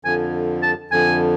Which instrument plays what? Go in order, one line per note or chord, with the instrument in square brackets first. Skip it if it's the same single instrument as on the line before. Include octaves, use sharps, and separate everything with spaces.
[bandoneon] F2 D3 F3 [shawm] G#5
[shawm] A5
[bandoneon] F2 D3 F3 [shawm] G#5